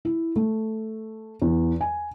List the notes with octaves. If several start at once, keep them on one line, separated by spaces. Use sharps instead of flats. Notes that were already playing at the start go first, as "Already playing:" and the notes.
E4
A3
E2
G#5